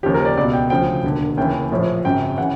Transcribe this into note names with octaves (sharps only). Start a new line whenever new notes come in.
D#2 C#3 F3 G4
A#4
D5
C#2 B2 D5
G5
D2 C#3 F3 G5
E1 D#2 D3
D#2 C#3 E3 G5
A#1 A2 F3
G#1 F#2 C#3 G5
C#3 E3 F#5